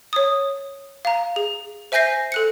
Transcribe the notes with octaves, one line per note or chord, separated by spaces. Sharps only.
C#5 D#6
F5 A#5
G#4
C5 E5 G#5 G6 A#6 C7
A4 F#6 C#7